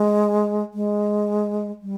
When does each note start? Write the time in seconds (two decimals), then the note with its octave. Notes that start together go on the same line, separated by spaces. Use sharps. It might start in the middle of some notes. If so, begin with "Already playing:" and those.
Already playing: G#3
0.74 G#3
1.82 G3